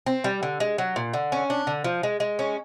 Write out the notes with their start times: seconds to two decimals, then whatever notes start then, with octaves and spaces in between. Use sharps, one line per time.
0.06 C4
0.24 G3
0.43 D3
0.60 G#3
0.78 F#3
0.96 A#2
1.13 D3
1.32 C#4
1.50 D4
1.67 D3
1.84 F3
2.03 G#3
2.20 G#3
2.39 C#4